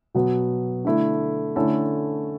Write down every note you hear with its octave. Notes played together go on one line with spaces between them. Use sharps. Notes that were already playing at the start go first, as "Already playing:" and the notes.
B2 F#3 B3
D3 A3 E4
D3 A3 C#4 E4 A4